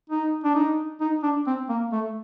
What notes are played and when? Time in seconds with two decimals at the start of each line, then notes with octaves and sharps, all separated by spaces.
0.10 D#4
0.44 D4
0.55 D#4
1.00 D#4
1.23 D4
1.46 C4
1.69 A#3
1.92 A3